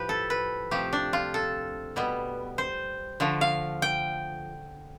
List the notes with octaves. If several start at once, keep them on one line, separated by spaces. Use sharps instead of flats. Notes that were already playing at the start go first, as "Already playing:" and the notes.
Already playing: A2 F3 G4 B4
A4
B4
C3 F3 A3 G4
D4
F4
A4
B2 G3 B3
C5
D3 F3 A3
F5
G5